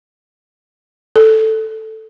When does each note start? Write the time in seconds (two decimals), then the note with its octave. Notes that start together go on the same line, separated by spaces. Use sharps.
1.16 A4